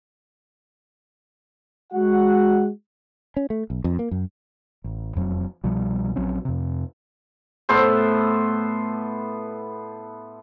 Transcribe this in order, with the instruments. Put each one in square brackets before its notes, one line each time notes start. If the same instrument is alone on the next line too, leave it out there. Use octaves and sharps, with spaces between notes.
[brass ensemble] G#3 F#4 F#5
[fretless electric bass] C#4
A3
B1
F2
A#3
F#2
[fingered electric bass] A1
E1 F2 F#3
C2 B2 F3 G3
A#1 F#3 C4 C#4
F2 C3
[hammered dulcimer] A2 B3 A4 C5